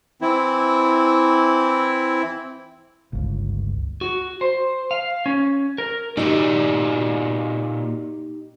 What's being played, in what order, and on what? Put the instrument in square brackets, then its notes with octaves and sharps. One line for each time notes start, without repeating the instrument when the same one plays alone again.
[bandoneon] E3 C4 E4
[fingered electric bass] G1 C#2
[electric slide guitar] F#4
C5
F5
C#4
A#4
[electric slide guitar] A#2 F#4 D5 [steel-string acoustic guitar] D#4 G4